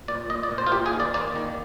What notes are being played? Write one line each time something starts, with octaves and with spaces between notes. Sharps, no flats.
A#2 D5
A#2 D#5
D5
A#2
C5
F4
A#3 G4
G#4
D#3
D5
A#3 D5
D#3